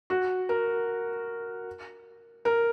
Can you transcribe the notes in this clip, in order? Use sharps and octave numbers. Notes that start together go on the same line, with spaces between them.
F#4
A#4
A#4